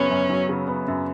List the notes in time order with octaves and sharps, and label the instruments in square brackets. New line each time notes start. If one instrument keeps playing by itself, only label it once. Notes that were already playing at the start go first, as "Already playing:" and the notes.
Already playing: [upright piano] F#2 C#3 F#3 B3 [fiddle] C#4
[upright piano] F#2
F#3
C#3
B3
F#2